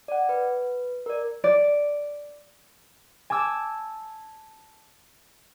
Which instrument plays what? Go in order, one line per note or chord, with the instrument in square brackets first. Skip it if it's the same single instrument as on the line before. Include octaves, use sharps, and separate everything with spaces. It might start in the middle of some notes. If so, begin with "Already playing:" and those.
[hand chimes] D5 F#5
B4
A#4 D5
[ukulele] D5
[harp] G#5 A5 D6 E6